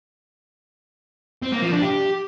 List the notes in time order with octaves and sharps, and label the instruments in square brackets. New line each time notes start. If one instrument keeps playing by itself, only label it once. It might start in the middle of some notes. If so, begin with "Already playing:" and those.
[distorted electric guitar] C4
A#3
F3
D4
G4